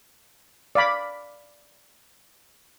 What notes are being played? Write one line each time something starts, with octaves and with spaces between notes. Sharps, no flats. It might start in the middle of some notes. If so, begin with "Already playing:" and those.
D5 F5 B5 D6